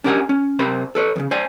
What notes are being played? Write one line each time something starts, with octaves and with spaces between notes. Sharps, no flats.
C#4 D4 G4 A#4 F#5 G#5
C#4
C3 A#4 C5 B5
A4 B4 C#5
E2 C#3
C5 D5 G#5